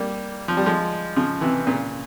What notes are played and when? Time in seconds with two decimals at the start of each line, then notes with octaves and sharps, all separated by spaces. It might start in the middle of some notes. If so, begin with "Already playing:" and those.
Already playing: G3 A#3
0.48 F3
0.57 G3
0.66 F3 G#3
1.16 C#3 F3
1.41 C3 E3
1.67 A#2 C#3